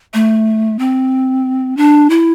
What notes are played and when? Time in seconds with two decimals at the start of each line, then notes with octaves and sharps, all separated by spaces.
0.14 A3
0.79 C4
1.77 D4
2.10 E4